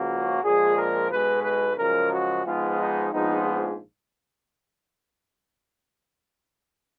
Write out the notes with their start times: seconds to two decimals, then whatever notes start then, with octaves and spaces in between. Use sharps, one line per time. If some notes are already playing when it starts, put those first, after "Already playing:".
Already playing: C#2 C#3 F3 A#3 F#4
0.42 A#1 A#2 F3 G#3 G#4
0.76 A#4
1.10 B1 B2 G#3 B4
1.44 B4
1.77 F#2 C#3 F3 G#3 A#4
2.11 F#4
2.44 G#2 F3 G#3 B3 F4
2.79 D#4
3.11 A#1 G#2 F3 G#3 B3 D#4